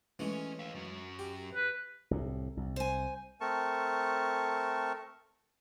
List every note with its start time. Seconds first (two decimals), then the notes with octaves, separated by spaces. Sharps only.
0.19 E3 G#3 A3 C#4
0.59 D#5 F5
0.75 F#2 F#3
1.19 G4
1.55 B4
2.11 C2 A2
2.57 C2
2.76 C5 G#5
3.41 A3 C4 A#4 A5 C#6